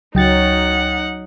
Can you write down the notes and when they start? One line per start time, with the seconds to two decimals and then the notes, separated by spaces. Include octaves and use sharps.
0.15 C#2 F#3 D#4 F#5 G5 A6